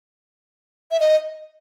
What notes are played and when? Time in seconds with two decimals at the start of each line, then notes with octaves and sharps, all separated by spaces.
0.91 E5
1.00 D#5